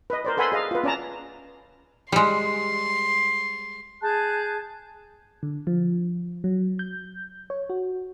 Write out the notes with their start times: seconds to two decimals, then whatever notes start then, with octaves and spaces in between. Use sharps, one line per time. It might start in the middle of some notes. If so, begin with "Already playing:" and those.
0.10 B4 D#5
0.25 A#4 C5 D5
0.37 A4 B4 F#5 G#5 B5 C6
0.52 G#4 D#5 F5
0.71 F4 B4
0.84 C#4 D5 A5 A#5
2.12 G3 G#3 C6
4.01 G#4 A5 F#6 G6
5.43 D3
5.67 F3
6.44 F#3
6.79 G6
7.50 C#5
7.70 F#4